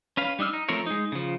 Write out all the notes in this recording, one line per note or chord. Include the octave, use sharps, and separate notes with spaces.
C#4 B4 F5
G3 D4 D#4 E6 F6
D#4
F3 A3 C4 A#4 C#5
G#3 D#4
C#3 F3